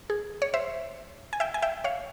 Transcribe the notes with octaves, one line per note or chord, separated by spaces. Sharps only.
G#4
C#5
C5 E5
G#5
E5 G5
G#5
E5 G5
C#5 F5